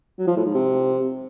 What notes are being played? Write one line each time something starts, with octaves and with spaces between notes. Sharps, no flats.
F#3
F3
A2
G#2
C3